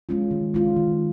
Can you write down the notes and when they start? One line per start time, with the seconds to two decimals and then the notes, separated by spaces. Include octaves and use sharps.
0.09 G#3 C#4 F4
0.31 D#3
0.54 G#3 C#4 F4
0.77 D#3